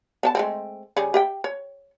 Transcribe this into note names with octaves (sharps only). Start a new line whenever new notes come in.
B3 C#5 A5
G#3 A3 C4
C#3 G3 G#4
G4 E5 G5
C#5